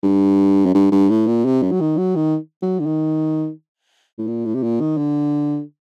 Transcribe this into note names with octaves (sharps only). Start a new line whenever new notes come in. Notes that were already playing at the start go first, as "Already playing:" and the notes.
G2
F#2
G2
G2
A2
A#2
C3
F#2
F#3
D#3
F#3
D#3
F#3
D3
D#3
A2
A#2
A2
C3
A#2
D#3
D3